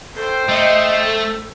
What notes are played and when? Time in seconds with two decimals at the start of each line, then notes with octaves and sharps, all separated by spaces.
0.16 A4 C5 G5
0.49 A3 D#5
1.05 A4